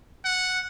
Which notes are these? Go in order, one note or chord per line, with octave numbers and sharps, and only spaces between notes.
F#5